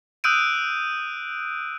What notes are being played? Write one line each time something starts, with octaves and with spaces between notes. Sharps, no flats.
D#6 E6 F#6 G6 D7 D#7